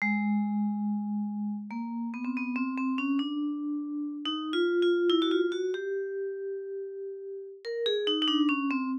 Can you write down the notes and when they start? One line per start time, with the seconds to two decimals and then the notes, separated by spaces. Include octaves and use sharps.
0.02 G#3
1.71 A#3
2.14 B3
2.25 C4
2.37 B3
2.56 C4
2.78 C4
2.98 C#4
3.19 D4
4.26 D#4
4.53 F4
4.82 F4
5.10 E4
5.22 F#4
5.31 F4
5.52 F#4
5.74 G4
7.65 A#4
7.86 G#4
8.07 D#4
8.22 D#4
8.28 D4
8.49 C#4
8.71 C4